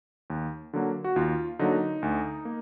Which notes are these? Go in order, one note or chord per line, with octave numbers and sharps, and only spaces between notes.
D#2
D3 F#3 A#3
F#4
D#2 F4
D3 F#3 A#3 D#4
D2
A#3